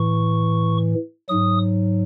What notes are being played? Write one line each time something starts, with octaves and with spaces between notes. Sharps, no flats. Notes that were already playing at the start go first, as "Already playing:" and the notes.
Already playing: A2 E3 C#6
G#2 F#3 D#6